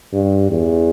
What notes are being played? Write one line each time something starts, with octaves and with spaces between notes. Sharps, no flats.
G2
E2